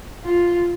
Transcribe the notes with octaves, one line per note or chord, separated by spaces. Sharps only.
F4